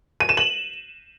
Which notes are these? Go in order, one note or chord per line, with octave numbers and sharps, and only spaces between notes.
D#7
E7
F#7